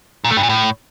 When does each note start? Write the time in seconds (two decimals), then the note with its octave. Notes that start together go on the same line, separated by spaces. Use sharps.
0.24 A#2
0.31 A3
0.37 G2
0.43 A#2
0.49 A2